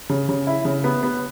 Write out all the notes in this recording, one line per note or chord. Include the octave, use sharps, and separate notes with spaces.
C#3
C#3
E4
C#3
B3
B3